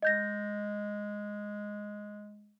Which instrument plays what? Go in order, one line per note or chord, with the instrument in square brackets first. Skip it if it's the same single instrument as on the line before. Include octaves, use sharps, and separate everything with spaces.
[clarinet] G#3 [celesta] D#5 G6 A#6